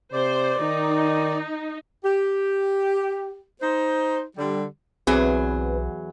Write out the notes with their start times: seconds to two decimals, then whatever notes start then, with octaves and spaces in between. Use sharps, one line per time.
0.13 C3 C5 D5
0.60 D#3 D#4
2.04 G4
3.62 D#4 C5
4.36 D3 G3
5.07 B1 E2 F#3 C4 G#4 B4